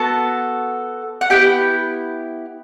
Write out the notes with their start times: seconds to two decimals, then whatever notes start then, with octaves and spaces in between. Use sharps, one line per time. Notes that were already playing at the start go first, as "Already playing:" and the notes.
Already playing: B3 F#4 A4 A5
1.21 F#5
1.30 B3 E4 G4 G5